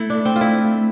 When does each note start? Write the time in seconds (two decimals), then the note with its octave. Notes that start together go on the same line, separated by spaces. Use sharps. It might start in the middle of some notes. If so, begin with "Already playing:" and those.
Already playing: A3 E4
0.10 D4
0.25 C4
0.36 F4
0.41 E4